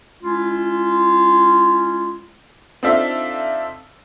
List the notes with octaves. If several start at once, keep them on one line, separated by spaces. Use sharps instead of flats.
G#3 C#4 E4 F4
C4 D4 D#4 F4 A4 E5